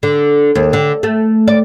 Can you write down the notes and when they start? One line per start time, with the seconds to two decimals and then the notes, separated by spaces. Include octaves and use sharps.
0.03 D3
0.55 D#2
0.73 D3
1.03 A3
1.48 D5